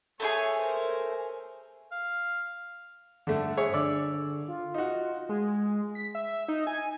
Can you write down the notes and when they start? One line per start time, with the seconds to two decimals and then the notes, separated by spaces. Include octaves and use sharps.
0.20 A3 E4 G#4 C#5 G#5
0.59 A#4 C5
1.92 F5
3.27 G2 D3 A3
3.57 G#4 C#5 E5
3.74 D3 D5 E6
4.48 F4
4.74 D#4 F#4
5.29 G#3
5.95 B6
6.15 E5
6.48 D#4
6.67 G#5